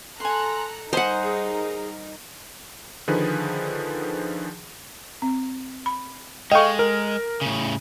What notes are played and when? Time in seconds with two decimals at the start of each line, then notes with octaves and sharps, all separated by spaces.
0.20 A4 G#5 A#5 C6 F#6
0.93 G3 D#4 A#4 C5 D#5 F#5 G#5 B5
1.23 G#4
3.08 D3 D#3 F3 G#4 B4
5.22 C4
5.86 B5
6.52 G#3 A4 D#5 F5 G5 C#6
6.79 A#4
7.41 A2 C#3